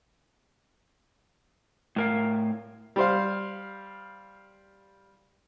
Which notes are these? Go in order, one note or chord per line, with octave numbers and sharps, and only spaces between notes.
A2 A#4 F5
G3 C5 F5